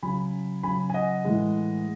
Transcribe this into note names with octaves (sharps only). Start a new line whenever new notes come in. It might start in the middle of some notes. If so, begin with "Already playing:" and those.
C#3 F#3 G#5 B5
C#3 F#3 G#5 B5
G#5
D#5 F#5
A2 E3 G#3